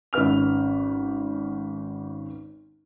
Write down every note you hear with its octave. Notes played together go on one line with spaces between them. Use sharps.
G#1 C#4 B4 F6 F7